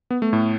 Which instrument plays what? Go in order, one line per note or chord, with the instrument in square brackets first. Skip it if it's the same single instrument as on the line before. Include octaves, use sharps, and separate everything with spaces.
[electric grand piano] B3
A3
A2